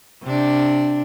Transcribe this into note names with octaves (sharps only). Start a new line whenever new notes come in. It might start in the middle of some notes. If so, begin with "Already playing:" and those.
C3 D4